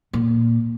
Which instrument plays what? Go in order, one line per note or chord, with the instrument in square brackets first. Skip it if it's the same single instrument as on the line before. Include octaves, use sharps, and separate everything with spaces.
[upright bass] A#2